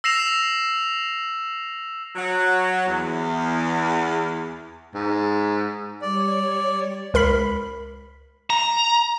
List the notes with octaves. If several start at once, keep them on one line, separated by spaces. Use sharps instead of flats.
E6 A#6 C7 E7 F7
F#3
E2
G#2
G3 C#5 D5
C#2 A#4 B5 B6
A#5